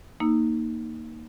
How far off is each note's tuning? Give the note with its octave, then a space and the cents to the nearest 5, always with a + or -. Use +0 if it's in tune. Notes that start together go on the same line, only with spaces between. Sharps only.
A#3 +0 D#4 +0 E6 +0